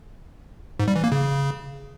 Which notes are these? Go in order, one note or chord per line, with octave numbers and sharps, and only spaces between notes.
G#2
G3
E3
A#3
C#3